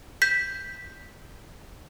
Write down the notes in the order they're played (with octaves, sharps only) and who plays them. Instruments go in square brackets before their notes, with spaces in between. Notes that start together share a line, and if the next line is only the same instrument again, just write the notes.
[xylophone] G6 B6